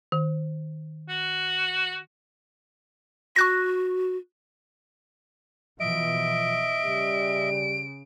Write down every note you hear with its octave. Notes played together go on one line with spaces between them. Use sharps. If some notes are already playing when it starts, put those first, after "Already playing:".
D#3
F#4
F#4 C#6 F#6 A#6
B2 E3 F3 D#5 E5 D7
C#3 G3